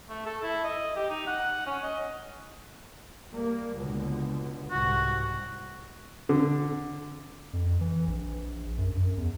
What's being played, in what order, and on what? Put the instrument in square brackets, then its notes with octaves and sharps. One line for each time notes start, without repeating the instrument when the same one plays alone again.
[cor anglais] A3
A4
E4
D#5
G4
D#4
F#5
C#4
D#5
[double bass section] G3 A#3
C#2 B2 D3
[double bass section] C2 G#2 [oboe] F#4
[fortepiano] D3
[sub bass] F2
E3
A#1
F#2
F#2
E2